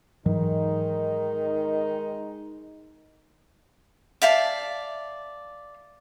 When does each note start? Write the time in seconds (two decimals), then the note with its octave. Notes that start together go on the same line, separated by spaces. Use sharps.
0.26 G#2 D#3 E3 F#3 G#3 D#4
4.22 D5 E5 F5 A5